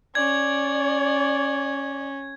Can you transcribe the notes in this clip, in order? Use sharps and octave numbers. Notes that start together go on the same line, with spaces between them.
C#4 D5 G#6